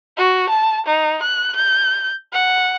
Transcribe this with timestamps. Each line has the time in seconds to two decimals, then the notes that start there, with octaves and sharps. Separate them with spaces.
0.17 F#4
0.49 A5
0.86 D#4
1.22 F#6
1.56 G6
2.33 F#5